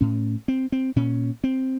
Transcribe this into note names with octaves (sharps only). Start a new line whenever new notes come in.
A2 C#4
C4
C4
A#2 C#4
C4